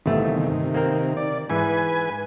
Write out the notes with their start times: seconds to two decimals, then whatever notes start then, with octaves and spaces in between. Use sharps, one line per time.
0.06 G1 E2 C3 D#3 A3
0.74 A#3 C4 A#4
1.17 D5
1.50 G#2 E3 B4 G#5